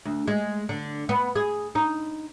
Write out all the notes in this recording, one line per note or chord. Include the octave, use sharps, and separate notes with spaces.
D2
G#3
D3
B3
G#4
D#4